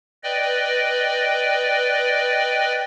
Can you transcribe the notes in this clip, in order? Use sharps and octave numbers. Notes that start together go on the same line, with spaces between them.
B4 D5 D#5 G5